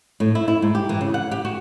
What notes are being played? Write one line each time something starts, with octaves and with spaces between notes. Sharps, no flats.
A2
E4
E4
G#2
G4
E3
C#3
F#5
G4
F#4